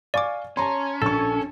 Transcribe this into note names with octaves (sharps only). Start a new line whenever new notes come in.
D5 F5 G#5 C#6 D6
C#4 A5 A#5 C6
A#1 A4 C#6 E6